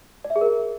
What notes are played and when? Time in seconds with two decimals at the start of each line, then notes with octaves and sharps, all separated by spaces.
0.24 D5
0.30 E5
0.36 G#4
0.41 A#4